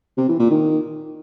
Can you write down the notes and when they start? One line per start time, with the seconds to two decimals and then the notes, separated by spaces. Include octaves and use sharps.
0.18 C3
0.28 E3
0.39 A#2
0.50 D#3